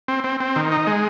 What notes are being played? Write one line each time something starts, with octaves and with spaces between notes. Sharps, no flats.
C4
C4
C4
D#3
D#4
G#3